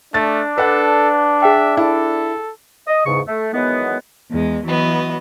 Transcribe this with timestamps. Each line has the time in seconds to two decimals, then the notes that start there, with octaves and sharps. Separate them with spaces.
0.14 A3 D4 A6
0.58 A4 B4 F#5
1.42 G#4 E5 G5
1.77 E4 A4
2.88 D#5
3.06 E2 G#2 C#3 C#6
3.28 A3
3.54 D#3 E3 F#3 G#3 B3
4.31 E2 G#3
4.65 E3 F#3 B3 D#5